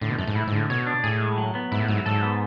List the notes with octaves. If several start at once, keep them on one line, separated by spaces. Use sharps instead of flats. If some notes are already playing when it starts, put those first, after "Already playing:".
A2 D3
B2
F#2 A3
G#2
A2 E4
G#2
D3
A2
B2 C#5
D4
A2 G#4
G#3
F#3
B3
G#2 E4
A2
G#2 F#3
G#2 A4
B3